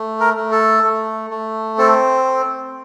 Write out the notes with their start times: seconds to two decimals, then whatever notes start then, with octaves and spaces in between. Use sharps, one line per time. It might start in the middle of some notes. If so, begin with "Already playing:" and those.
Already playing: A3
0.20 A#4
0.37 A3
0.51 A4
0.83 A3
1.30 A3
1.78 C4 A4